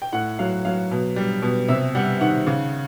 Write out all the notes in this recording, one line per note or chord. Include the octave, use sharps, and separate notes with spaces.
G5
A2 F#5
F#3 F5
F#3 F5
B2
G3
B2
C3 E5
G3 F#5
D#3 F#5
C#3